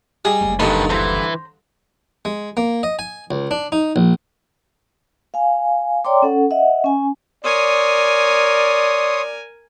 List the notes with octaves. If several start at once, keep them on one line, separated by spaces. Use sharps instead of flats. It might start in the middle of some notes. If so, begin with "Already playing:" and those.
G3 G#4 D#5
F#1 D2
G2 D3 D#3 D#4 B4 A5
E3 E4 C5 A#5
G#3
A#3
D#5
G#5
C#2
D4
D#4
A#1
F5 G#5
C#5 D5 G5 A#5 C6 D6
C#4 A4 F#5
D#5 E5 F#5
C#4 G#5
A#4 C#5 D5 G#5 C6 D#6